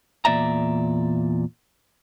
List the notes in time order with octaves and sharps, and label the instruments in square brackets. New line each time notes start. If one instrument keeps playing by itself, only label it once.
[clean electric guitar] E2 A#2 D5 E5 A#5